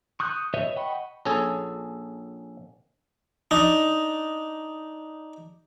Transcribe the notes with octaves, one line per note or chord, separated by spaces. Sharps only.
C#6 D#6 F#6 G6
B4 C#5 D#5 E5
D#5 F#5 G5 B5 C#6
A#1 C#4 G#4 A4 G#5
D4 D#4